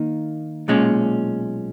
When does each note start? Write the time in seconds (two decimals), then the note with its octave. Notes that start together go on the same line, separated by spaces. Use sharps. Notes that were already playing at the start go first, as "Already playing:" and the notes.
Already playing: D#3 A#3 D#4
0.68 B1 A#2 G#3 C#4